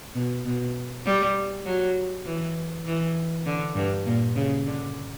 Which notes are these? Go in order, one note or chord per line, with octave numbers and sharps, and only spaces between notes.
B2
B2
G3
F#3
E3
E3
D3
G2
A#2
C#3
D3